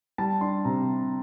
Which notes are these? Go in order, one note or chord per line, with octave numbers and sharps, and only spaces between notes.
G3 A5
D4 C6
C3 A#5